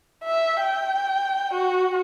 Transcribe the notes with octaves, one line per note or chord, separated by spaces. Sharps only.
E5
G5
F#4